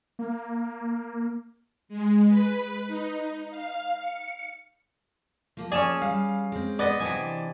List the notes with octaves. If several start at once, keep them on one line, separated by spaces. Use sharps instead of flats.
A#3
G#3
B4
D#4
F5
C#7
F3 A#3
C#4 G#4 D5 E7
G3 F5
G#3 C4
B3 D5 D#5
C3 E3 D4 G#5